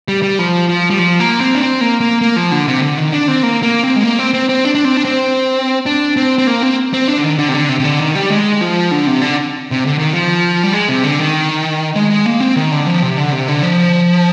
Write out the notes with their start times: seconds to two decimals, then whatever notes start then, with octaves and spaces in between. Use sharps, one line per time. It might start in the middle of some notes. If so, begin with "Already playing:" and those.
0.08 G3
0.23 G3
0.39 F3
0.69 F3
0.90 G3
0.99 F3
1.20 A#3
1.40 C4
1.55 D4
1.60 C4
1.81 A#3
2.00 A#3
2.21 A#3
2.36 F3
2.51 D3
2.67 C3
2.82 D3
2.98 D#3
3.12 D4
3.28 C4
3.43 A#3
3.63 A#3
3.83 C4
3.96 G#3
4.03 A#3
4.19 C4
4.34 C4
4.49 C4
4.65 D4
4.75 D4
4.85 C4
4.97 D4
5.05 C4
5.86 D4
6.17 C4
6.38 C4
6.47 A#3
6.63 C4
6.93 C4
7.08 D4
7.18 D3
7.24 D#3
7.39 D3
7.48 C3
7.54 D3
7.69 C3
7.79 C3
7.84 D3
8.00 D#3
8.15 G3
8.30 G#3
8.61 F3
8.91 D3
9.07 C3
9.21 D3
9.71 C3
9.86 D3
9.99 D#3
10.13 F3
10.63 G3
10.73 G#3
10.89 C3
11.04 D3
11.19 D#3
11.96 G#3
12.10 G#3
12.26 A#3
12.40 C4
12.56 D#3
12.72 D3
12.87 F3
13.02 C3
13.17 D3
13.32 C3
13.48 D3
13.62 F3